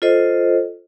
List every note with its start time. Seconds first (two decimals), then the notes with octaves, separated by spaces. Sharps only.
0.02 F4 A4 C5 D#5